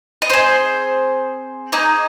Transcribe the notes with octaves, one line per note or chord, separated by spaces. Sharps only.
D#5
C4 G#4 C5
A#3 D#4 G#4 D#5